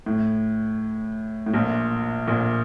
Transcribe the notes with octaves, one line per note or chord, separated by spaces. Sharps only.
A2
A2
A#1 A#2
A#1 A#2